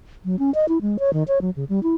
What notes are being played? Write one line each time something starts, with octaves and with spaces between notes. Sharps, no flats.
F#3
C#4
D#5
E4
G#3
C#5
D#3
C#5
F#3
C#3
G3
E4